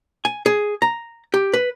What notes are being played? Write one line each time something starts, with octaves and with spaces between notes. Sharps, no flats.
G#5
G#4
A#5
G4
B4